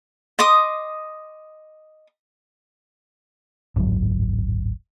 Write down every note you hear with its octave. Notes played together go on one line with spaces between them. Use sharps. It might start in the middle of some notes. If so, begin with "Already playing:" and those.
D#5 C6 D6 D#6
D1 G#1 F#2 F#3